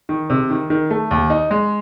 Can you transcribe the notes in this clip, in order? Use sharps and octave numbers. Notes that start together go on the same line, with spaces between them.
D#3
C3
D#3
D#3
A3
D#2
D#4
G#3